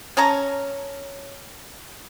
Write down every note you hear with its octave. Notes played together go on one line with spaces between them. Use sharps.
C#4 C#5 A5 A#5